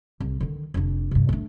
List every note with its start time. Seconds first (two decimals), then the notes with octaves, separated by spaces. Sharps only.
0.20 C2
0.40 D3 D#3
0.74 F1 D4
1.11 G2 C3
1.29 A3 D4